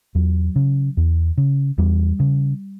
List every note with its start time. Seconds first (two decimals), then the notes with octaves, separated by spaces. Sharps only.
0.15 E2 F#3
0.56 C#3
0.97 E2
1.38 C#3
1.78 E2 G3
2.20 C#3